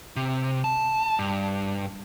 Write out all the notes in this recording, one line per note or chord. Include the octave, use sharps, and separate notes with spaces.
C3
A5
G2